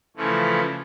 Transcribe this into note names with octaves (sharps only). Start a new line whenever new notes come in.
C#3 E3 F3 A3 C#4